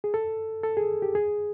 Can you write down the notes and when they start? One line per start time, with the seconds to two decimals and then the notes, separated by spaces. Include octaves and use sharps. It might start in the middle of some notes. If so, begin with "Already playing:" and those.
0.04 G#4
0.14 A4
0.63 A4
0.77 G#4
1.02 G4
1.15 G#4